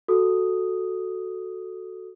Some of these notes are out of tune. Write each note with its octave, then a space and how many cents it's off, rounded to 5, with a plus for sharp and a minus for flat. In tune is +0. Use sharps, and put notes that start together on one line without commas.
F#4 +0 A4 +0 D#6 +0